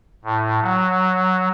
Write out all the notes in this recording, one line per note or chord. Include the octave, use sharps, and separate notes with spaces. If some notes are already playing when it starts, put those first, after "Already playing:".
A2
F#3